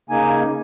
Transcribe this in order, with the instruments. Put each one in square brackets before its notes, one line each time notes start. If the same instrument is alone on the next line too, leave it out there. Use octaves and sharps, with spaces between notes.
[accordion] C#3 A#3 D#4 G#5